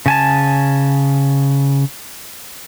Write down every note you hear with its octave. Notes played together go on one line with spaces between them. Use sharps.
C#3 G#5 A5